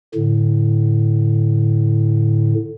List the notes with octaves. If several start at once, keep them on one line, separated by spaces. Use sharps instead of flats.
A2 D3